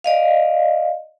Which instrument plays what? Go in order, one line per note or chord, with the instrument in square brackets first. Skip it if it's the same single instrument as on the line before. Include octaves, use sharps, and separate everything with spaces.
[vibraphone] D5 D#5 F5